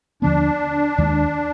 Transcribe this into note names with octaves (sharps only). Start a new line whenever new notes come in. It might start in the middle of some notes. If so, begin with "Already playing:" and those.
D#2 D3 F3 B3 D4
D#2 D#3 G#3